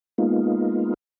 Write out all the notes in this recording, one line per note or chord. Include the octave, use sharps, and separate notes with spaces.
G#3 A#3 B3 D#4 F4